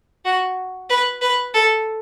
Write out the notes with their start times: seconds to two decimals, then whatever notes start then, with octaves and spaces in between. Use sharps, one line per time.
0.25 F#4
0.90 B4
1.21 B4
1.54 A4